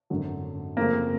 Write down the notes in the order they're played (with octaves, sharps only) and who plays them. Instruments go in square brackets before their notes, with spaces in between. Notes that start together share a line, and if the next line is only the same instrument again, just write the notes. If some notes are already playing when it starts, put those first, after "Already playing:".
[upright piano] G#1 F#2 D3 F#3
[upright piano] F#2 C#3 F3 A3 C4 [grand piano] A#3